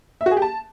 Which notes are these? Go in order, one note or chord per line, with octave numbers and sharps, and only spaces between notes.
E5
F#4
G#4
G4
A5